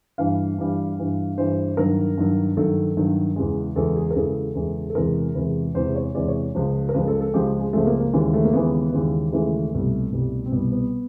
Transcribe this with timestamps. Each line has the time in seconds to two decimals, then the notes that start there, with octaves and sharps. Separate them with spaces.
0.18 G2 E3 G3 F5
0.58 G2 E3 G3
0.98 G2 E3 G3
1.37 G2 E3 G3 C5
1.77 G2 D#3 F#3 A#4
2.18 G2 D#3 F#3
2.57 G2 D#3 F#3 A4
2.97 G2 D#3 F#3
3.36 E2 C#3 E3 G#3
3.76 E2 C#3 E3 G#3 A4
3.96 G#4
4.11 A#4
4.15 E2 C#3 E3 G#3 A4
4.55 E2 C#3 E3 G#3
4.90 A4
4.95 E2 C3 E3 G#3 A#4
5.35 E2 C3 E3 G#3 B4
5.75 E2 C3 E3 G#3 C5
5.95 C#5
6.15 E2 C3 E3 G#3 D5
6.28 C#5
6.54 C#2 C#3 F3 G#3 C5
6.89 A#4
6.94 C#2 C#3 F3 G#3 B4
7.07 A4
7.21 A4
7.34 C#2 C#3 F3 G#3 G4
7.60 G#3
7.73 C#2 C#3 F3 G#3 A3
7.87 A#3
8.00 A#3
8.13 D#2 C#3 E3 G#3
8.34 A3
8.45 A#3
8.53 D#2 C#3 E3 G#3 B3
8.93 D#2 C#3 E3 G#3
9.32 D#2 C#3 E3 G#3 A3
9.72 C2 B2 G3
10.12 C2 B2 G3
10.46 C4
10.52 C2 B2 G3 B3
10.72 B3